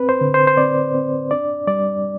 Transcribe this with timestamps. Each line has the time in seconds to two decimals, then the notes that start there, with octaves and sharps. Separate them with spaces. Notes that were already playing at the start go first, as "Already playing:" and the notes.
Already playing: C4 B4
0.09 C5
0.21 D3
0.34 C5
0.47 C5
0.57 C4 D5
0.95 C4
1.31 D4 D5
1.67 G3 D5